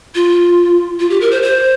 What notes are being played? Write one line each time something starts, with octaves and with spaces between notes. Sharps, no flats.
F4
F4
G4
A#4
C5
C5